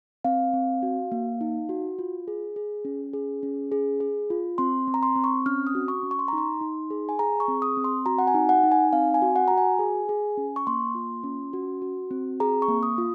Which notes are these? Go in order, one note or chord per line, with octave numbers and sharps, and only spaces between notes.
C4 F5
C4
F#4
A#3
D#4
F#4
F4
G#4
G#4
C#4
G#4
C#4
G#4
G#4
F4
C4 C6
C4
A#5
C6
C4
C#6
C#4 F6
D#6
F#4
C#6
C#4
C#6
C6
A#5
D#4
C6
D#4
G#4
G#5
G#4 A#5
C#6
C4
D#6
C4
C6
F#4 A#5
F#5
G#5
D#4
F#5
D#4
G#5
C4 F5
G#5
F#4
F#5
F#4 A#5
G#5
G#4
G#4
C#4
C#6
A#3 C6
F4
C#4
F#4
F#4
C4
G#4 A#5
C#6
A#3
D#6
F4